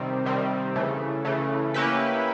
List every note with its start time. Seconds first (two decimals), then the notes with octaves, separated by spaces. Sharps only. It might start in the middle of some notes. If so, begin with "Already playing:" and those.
Already playing: C3 D#3 G3 C4
0.25 C3 D#3 G3 C4
0.76 C#3 E3 A3
1.25 C#3 E3 A3
1.74 A#3 C#4 E4 G4 B4